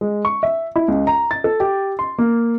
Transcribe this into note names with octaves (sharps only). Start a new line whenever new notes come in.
G#3
C#6
E5
E4
C#2
A#5
A6
A4
G4
C6
A#3